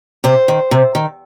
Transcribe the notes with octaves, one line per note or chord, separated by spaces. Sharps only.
C3 C5
D#3
C3
D#3